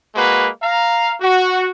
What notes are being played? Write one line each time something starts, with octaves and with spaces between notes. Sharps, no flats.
G#3 A#3 F#4 B4
F5 A#5
F#4